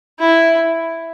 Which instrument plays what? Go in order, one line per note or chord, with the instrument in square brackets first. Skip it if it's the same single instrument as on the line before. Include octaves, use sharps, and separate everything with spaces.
[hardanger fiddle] E4